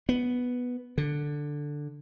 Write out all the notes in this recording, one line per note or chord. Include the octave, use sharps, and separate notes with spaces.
B3
D3